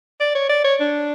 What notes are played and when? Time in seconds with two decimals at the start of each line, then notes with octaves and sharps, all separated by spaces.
0.20 D5
0.35 C#5
0.49 D5
0.64 C#5
0.80 D4